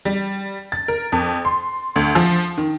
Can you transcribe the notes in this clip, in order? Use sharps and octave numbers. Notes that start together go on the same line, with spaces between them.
G3
A6
A#4
F2
C6
D2
F3
D#3